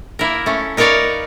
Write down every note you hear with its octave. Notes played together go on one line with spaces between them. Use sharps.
A#3 E4 A#4
A3 C#4
D#4 A#4 B4 C#5 D5 F5